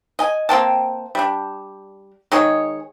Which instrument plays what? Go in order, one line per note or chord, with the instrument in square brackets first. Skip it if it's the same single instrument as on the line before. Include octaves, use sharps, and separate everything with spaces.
[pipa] D#5 G#5
A#3 C4 G5 A5
G3 D4
D#3 G#3 G#4 C#5